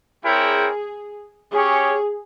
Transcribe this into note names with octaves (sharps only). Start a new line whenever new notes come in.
C4 E4 G#4 A#4 C#5 G5
C#4 G4 G#4 C#5